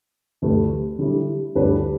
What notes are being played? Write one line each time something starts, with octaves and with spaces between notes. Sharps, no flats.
D2 D3 A3 G4 B4
D3 G3 E4
D2 D3 G3 D4 B4